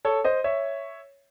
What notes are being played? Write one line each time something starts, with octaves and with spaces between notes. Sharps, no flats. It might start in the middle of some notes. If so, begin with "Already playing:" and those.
A4 C#5
C5 D#5
C#5 E5